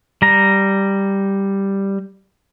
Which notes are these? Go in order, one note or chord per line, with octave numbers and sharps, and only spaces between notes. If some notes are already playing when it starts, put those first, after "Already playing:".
G3 A#5